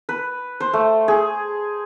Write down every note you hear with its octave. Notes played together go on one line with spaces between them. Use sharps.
B4
C5
A3
G#4